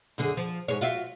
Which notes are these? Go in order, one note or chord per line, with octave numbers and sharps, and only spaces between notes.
F#2 D3 G#4
F3
G#2 G#4 C#5
F4 F#4 E5